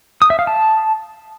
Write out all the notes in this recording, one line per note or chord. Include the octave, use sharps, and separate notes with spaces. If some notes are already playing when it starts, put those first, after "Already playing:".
D#6
E5
F5
A5